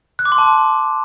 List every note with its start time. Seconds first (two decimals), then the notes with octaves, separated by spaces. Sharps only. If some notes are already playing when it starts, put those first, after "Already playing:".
0.19 F#6
0.25 D6
0.32 C6
0.38 A5